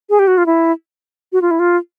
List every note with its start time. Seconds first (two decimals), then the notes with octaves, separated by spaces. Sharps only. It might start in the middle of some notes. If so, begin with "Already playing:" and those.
0.10 G#4
0.19 G4
0.27 F#4
0.38 F4
0.46 E4
1.33 F#4
1.42 F4
1.51 E4
1.59 F4